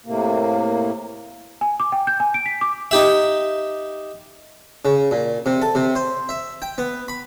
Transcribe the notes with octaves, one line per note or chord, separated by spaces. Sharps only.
A2 C3 A#3
G#5
D6
G5
G6
G#5
D7
B6
D6
D#4 G4 E5
C#3
A#2
C3
A4
C3
C5
E5
G5
B3
B5